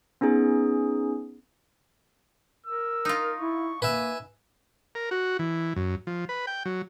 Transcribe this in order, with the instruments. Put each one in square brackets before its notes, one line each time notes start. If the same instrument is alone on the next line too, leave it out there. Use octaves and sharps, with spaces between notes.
[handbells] B3 C#4 D#4 G#4
[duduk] A#4 [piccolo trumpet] E6
[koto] D#4 F4
[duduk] E4 [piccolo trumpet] C#6
[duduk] A#3 [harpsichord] B4 E5 [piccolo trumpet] G#5
[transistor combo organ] A#4
F#4
E3
F#2
F3
B4
G5
F#3